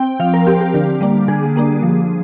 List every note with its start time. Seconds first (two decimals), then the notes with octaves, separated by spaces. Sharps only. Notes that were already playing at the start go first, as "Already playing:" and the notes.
Already playing: C4 G5
0.20 F3 F5
0.34 A#4
0.46 C4 G4
0.61 G4
0.74 D3
1.01 G3 A#3 D4
1.28 D3 G#4
1.56 G3 A#3 D4
1.83 F3